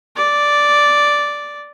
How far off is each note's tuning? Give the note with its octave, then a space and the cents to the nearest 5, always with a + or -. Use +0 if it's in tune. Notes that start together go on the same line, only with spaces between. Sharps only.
D5 -5